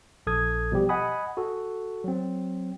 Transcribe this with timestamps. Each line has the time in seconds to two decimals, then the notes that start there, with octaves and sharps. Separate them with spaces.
0.27 A#1 A4 D#6 G#6
0.72 B2 F3 G3 G4
0.89 D#5 F#5 G#5 B5 D#6
1.37 F#4 A4
2.04 F#3 C4